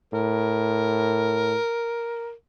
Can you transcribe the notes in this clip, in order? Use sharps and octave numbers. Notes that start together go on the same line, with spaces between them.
A2 A#4